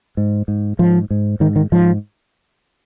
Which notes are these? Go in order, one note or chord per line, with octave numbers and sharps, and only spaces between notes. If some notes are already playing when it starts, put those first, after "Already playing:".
G#2
G#2
G#2 F3
G#2
G#2 D#3
D#3
G#2 F3